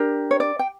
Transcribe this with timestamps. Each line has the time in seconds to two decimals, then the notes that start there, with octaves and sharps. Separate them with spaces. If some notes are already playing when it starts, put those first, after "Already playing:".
Already playing: D4 G4 A#4
0.31 C#5
0.40 D5
0.59 G5